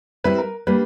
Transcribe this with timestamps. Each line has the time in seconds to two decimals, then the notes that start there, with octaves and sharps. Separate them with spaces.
0.24 G3 C4 E4 B4
0.38 A#4
0.67 G3 A#3 D4 B4